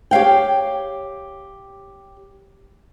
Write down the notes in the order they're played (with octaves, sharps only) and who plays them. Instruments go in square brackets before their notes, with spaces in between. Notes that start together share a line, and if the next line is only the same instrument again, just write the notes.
[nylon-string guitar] G4 C#5 F5 G5